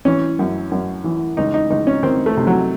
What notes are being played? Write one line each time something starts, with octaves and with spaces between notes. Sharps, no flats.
E3 C#4
F#2
F#2
E3
C#2 D#4
D#4
C#2 D#4
C#4
D#3 C4
A3
C3
F#3